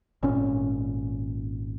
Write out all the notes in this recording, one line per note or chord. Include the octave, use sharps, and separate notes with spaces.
G#1 A#2 C#4